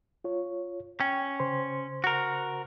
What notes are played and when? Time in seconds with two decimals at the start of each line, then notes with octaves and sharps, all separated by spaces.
0.24 F4 C#5
1.00 C#4 G5
1.40 C#3 C5 C6
2.04 F#4 A#4